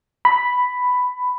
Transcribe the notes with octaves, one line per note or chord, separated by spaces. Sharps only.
B5